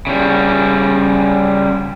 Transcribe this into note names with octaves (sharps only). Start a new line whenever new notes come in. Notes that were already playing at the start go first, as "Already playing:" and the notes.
C#3 G3